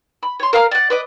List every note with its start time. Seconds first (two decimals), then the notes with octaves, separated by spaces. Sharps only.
0.23 B5
0.40 C#5 C6
0.53 A#4 F5 A#5 F6
0.71 D5 F#5
0.90 B4 D5 D#5